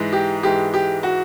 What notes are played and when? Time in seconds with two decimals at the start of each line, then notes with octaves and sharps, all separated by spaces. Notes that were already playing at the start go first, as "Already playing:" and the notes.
Already playing: G#2 E3 G#3
0.12 G4
0.43 G#2 E3 G#3 G4
0.74 G4
1.03 F#4